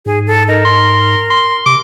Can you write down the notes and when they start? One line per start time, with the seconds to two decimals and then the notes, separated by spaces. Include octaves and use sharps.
0.06 G#2 G#4
0.27 A4
0.48 D#4 A#4
0.65 C6
1.30 C6
1.66 C3 D6